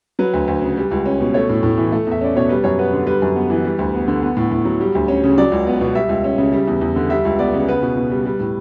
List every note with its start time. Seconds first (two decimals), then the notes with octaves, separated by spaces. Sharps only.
0.19 F#3 B4
0.33 D2
0.48 D2
0.62 C#3
0.77 G3
0.91 C#2
1.06 C#4
1.20 B2
1.34 A3 C#5
1.49 A2
1.63 A2
1.78 E3
1.92 A3
2.07 E2 E5
2.21 C#4 D5
2.36 B2 C#5
2.49 G3 B4
2.64 F#2 C#5
2.79 B3 B4
2.93 D3
3.07 G3 B4
3.22 F#2
3.36 B3
3.50 E3
3.64 G3
3.79 D2
3.94 B3
4.07 D3
4.23 B3
4.37 A2
4.52 A2
4.65 F#3
4.81 G3
4.95 D2
5.08 C#4
5.24 C#3
5.38 F#3 D5
5.52 C#2
5.67 B3
5.81 B2
5.95 G3 E5
6.09 C#2
6.24 C#4
6.38 C#3
6.53 G3
6.68 E2
6.81 E2
6.96 D3
7.10 G3 E5
7.25 C#2
7.39 B3 D5
7.54 C#3
7.68 B3 B4
7.82 B2
7.97 B2
8.11 G3
8.26 G3
8.40 A2